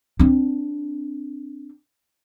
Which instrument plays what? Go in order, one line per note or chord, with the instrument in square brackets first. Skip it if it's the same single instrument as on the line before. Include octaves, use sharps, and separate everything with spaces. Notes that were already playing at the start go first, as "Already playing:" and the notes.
[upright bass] C4 D4